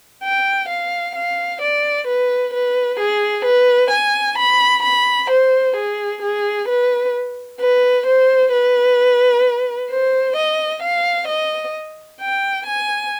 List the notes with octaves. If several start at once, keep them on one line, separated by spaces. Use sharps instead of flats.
G5
F5
F5
D5
B4
B4
G#4
B4
G#5
B5
B5
C5
G#4
G#4
B4
B4
C5
B4
C5
D#5
F5
D#5
G5
G#5